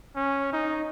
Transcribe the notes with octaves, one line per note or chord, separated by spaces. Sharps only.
C#4
D#4